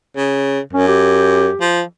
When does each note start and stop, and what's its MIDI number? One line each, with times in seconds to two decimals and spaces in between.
0.17 0.60 49
0.73 1.49 42
0.73 0.83 61
0.88 1.63 67
1.61 1.82 53